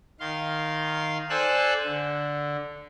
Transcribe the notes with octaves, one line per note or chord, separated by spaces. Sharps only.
D#3 F5 C6
A4 C5 D5 G#5 E6 F#6
D3